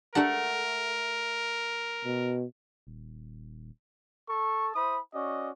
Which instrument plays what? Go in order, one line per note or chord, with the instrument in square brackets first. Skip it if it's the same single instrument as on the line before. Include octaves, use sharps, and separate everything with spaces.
[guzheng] A3 F#5 [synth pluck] D4 G4 A#5 [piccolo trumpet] A#4
[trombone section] B2
[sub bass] D#1
[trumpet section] A4 A5 C#6
E4 C5 B5 D#6
C#4 F#4 D5 D#5